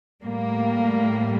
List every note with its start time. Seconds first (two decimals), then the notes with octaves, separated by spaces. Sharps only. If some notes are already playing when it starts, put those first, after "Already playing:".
0.24 A2 G3 A#3